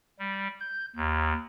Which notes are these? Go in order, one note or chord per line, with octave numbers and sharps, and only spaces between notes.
G3
G6
D#2